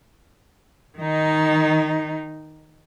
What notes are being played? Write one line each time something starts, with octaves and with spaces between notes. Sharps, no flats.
D#3 D#4